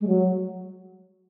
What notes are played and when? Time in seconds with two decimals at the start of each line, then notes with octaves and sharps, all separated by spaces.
0.01 G#3
0.07 F#3